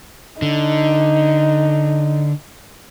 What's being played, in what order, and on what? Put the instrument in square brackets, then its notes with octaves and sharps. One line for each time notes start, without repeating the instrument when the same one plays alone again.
[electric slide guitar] D3 [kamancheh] D#4